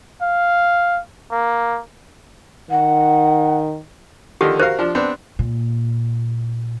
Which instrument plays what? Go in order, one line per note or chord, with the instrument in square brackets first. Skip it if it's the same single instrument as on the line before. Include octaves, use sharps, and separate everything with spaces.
[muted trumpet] F5
A#3
[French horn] D#3 [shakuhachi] F#5
[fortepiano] D3 D#3 F3 [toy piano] G4
[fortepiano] F#4 A#4 F5 [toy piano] C5
[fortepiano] F3 D4
B3 C4 D4
[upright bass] A#2